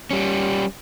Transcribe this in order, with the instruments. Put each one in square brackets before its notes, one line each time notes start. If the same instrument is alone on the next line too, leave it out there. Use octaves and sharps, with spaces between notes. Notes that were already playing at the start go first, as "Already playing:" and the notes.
[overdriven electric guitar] G3 C#4